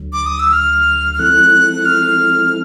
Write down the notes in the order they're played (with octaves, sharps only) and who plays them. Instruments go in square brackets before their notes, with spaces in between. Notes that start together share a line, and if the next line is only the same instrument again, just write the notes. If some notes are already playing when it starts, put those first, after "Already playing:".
Already playing: [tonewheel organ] D2 D3 F#3
[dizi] D6
D#6
E6
F6
F6
[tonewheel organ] F3 G#3 C4 E4 A4 [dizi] F#6
[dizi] F6